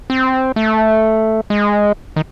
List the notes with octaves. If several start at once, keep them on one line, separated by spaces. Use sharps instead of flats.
C4
A3
G#3
D#3